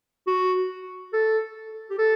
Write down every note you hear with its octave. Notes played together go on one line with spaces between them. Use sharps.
F#4
A4
G4
A4